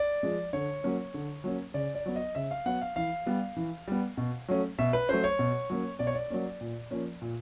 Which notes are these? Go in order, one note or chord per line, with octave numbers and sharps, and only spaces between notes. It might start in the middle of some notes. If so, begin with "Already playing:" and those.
Already playing: D5
F3 G#3
D3 C#5
F#3 A#3 C#4
D3
F#3 A#3 C#4
C#3 D5
D5
F#3 B3
D#5
C#3 E5
F5
F#3 B3 F#5
F5
E3 F5
G3 B3
E3
G3 B3
B2
F#3 A3 C#4
B2 E5
B4
F#3 A3 C#4 C5
C#5
B2
F#3 A#3 C#4
B2 D5
C#5
D5
F#3 A#3 C#4
A#2
F3 A#3 C#4
A#2